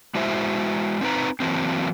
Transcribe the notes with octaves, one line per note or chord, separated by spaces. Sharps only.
G#3 E4 F#4 C5 E5
C4 D#4 B4 A#5
E3 F#3 A#3 C4